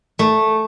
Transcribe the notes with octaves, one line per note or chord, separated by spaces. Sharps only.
A3